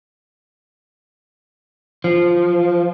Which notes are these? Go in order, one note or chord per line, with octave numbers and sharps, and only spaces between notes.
F3